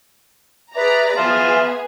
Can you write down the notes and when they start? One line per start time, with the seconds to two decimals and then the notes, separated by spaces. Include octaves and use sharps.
0.76 G#4 B4 D5 E5 A#5
1.17 B3 G#4 E5 F5 A5 C6